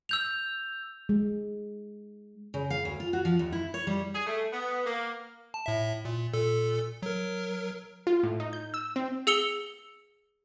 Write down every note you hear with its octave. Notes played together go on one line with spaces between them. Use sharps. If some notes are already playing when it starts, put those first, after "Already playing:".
E6 G6 F7
G#3
C#3
F5
D2
F4
F#4
F3
D#2
E4
C#5
G3
G#4
A3
B3
A#3
A5
A2 E5
A#2
A#2 A4
F#3 A#4
F4
A2
D#4
G6
E6
C4
G#4 E6 C#7 F7 G7